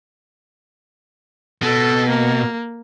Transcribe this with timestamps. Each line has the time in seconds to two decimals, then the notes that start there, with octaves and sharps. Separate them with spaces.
1.62 B2 A4
2.09 A#3